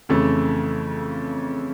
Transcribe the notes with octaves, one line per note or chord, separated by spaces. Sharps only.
F2 C#3 E3 A3